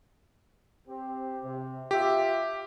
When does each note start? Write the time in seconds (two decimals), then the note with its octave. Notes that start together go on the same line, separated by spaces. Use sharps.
0.88 C4 G4
1.43 C3
1.91 F4 G4 E5